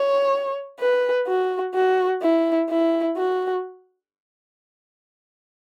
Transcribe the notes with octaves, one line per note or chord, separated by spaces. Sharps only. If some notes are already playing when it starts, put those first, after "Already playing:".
Already playing: C#5
B4
F#4
F#4
E4
E4
F#4